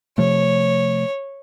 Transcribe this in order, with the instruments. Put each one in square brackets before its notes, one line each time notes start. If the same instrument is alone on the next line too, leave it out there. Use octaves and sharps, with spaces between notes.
[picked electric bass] C3 F3 A3 [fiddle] C#5